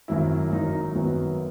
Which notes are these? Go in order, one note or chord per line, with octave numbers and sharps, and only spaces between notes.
G#1 F#2 D#3 F#3 E4
G#1 F#2 D#3 F#3 D#4
D#4
G#1 F#2 D#3 F#3 B3